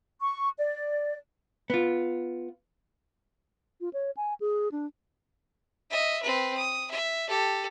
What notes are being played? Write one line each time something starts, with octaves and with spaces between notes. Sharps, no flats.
C#6
D5
B3 F4
F4
C#5
G#5
G#4
D4
D#5 E5
C4 B4
D#6
E5
G4 A4